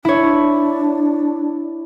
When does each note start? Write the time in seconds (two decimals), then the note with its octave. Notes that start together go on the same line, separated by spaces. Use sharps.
0.05 D4 E4 C#5